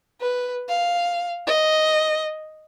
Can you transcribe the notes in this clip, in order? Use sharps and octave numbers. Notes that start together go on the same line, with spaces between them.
B4
F5
D#5